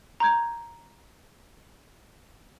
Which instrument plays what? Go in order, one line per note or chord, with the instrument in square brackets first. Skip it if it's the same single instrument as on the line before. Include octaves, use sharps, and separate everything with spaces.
[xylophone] A#5 C6 G6 G#6